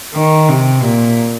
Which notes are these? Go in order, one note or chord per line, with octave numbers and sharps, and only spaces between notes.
D#3
C3
A#2